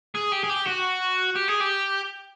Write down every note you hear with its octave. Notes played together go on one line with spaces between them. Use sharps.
G#4
G4
G#4
G4
F#4
G4
G#4
G4